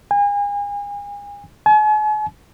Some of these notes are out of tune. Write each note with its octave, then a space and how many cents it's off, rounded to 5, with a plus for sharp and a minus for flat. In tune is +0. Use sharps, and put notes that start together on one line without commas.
G#5 -35
G#5 +45